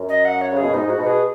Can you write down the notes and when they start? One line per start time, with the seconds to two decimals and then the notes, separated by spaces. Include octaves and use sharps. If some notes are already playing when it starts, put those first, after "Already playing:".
Already playing: F#2
0.09 D#5
0.25 F#5
0.41 C#5
0.52 C#3
0.57 G#4
0.62 B2
0.73 G#2 D#4
0.87 G#2 F#4
0.98 B2
1.06 G#4